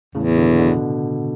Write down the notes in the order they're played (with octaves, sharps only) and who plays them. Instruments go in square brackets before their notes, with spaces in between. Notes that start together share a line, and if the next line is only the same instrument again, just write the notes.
[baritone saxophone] E2 [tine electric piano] A2 C#3
[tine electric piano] B2 D3
B2 D3